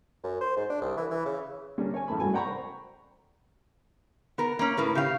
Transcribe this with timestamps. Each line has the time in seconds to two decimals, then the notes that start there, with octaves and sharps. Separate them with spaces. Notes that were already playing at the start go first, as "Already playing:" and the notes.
0.24 F#2
0.41 C5
0.57 G#2
0.70 D4
0.82 C2
0.97 E3
1.10 E3
1.25 C#3
1.78 D3 G3 A#3 C#4 D4
1.94 C#5 G#5
2.08 A1 F#2 A2 A3 A5 B5
2.20 G2 A3 F#4 G#5
2.33 D5 F#5 G5 A#5 B5 C#6
2.47 C5
4.38 B3 A#4
4.59 A#3 C#4
4.77 A2 A#4 B4
4.95 C#3 G4 F5